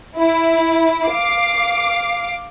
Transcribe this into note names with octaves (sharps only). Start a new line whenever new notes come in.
E4
F5 D6 C7